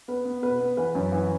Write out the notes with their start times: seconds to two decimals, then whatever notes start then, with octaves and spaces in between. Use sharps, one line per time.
0.08 B3 B4
0.25 B3
0.42 B2 B4
0.60 B3
0.77 E3 B4
0.95 F#2
1.12 E3